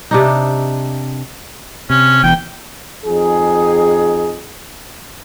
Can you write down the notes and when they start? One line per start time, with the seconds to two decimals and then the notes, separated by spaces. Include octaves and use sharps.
0.11 C3 D4 D#4
1.90 C3 C#4
2.23 E1 E2 G5
3.05 F2 D#4 G#4